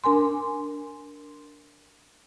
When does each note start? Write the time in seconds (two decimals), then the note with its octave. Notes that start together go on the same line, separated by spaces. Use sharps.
0.04 D4 A#4 G#5 C6